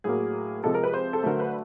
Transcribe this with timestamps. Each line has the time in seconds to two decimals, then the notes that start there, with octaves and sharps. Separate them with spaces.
0.04 A2 F#3 A#3 G#4
0.64 C3 F3 G#3 A4
0.74 A#4
0.84 B4
0.93 C5
1.13 A4
1.23 D3 F#3 A3 A#4
1.40 B4